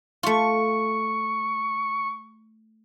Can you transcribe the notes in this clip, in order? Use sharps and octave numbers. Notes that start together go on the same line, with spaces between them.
A3 F4 C#6